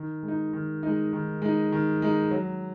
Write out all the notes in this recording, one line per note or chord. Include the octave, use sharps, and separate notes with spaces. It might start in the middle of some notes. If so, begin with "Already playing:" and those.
Already playing: D#3
G#3
D#4
D#3
G#3 D#4
D#3
G#3 D#4
D#3
G#3 D#4
F#3